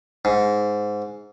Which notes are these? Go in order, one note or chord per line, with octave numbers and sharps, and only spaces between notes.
G#2